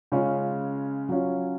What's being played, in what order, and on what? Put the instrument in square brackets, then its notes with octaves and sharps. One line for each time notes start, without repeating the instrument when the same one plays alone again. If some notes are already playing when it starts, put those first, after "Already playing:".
[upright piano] C#3 G#3 C#4 F4
F#3 C#4 F4